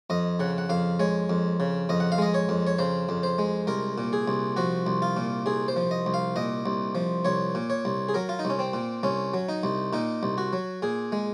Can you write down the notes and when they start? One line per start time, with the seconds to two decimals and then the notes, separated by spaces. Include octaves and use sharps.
0.10 F2 D#5
0.40 C#3 F#5
0.58 F#5
0.70 F2 F5
1.00 G#3 C#5
1.30 F2
1.60 C#3
1.89 F2 D#5
2.00 F#5
2.12 F5
2.18 G#3 D#5
2.34 C#5
2.49 F2
2.67 C#5
2.79 C#3 C5
3.09 F2
3.23 C5
3.39 G#3
3.67 C2 A#4
3.98 A#2
4.13 G#4
4.28 C2
4.57 F3 F#4
4.87 C2
5.02 F4
5.17 A#2
5.46 C2 G#4
5.68 C5
5.76 F3
5.91 D#5
6.06 C2
6.14 F5
6.36 A#2 D#5
6.66 C2
6.95 F3
7.25 C2 C#5
7.55 A#2
7.70 C#5
7.85 C2
8.09 G#4
8.14 F#3 A#4
8.29 F4
8.39 D#4
8.45 C2 C#4
8.59 C4
8.74 A#2
9.03 C2 C#4
9.34 F#3
9.49 D#4
9.63 C2
9.93 A#2 D#4
10.23 C2
10.38 F#4
10.53 F#3
10.82 A#2 G#4
11.12 G#3